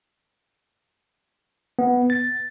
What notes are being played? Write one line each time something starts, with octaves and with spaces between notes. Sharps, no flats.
B3
A6